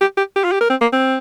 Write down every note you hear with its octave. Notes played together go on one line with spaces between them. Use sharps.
G4
G4
G4
F4
G4
A#4
C4
A#3
C4